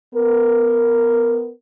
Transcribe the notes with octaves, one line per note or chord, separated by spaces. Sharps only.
B3 A#4